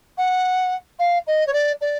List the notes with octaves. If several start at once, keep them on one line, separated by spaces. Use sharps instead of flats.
F#5
F5
D#5
C#5
D5
D5